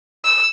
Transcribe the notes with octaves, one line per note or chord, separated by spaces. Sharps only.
E6